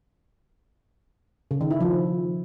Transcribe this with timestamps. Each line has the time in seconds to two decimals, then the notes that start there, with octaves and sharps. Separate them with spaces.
1.51 C#3
1.61 D#3
1.71 E4
1.81 F3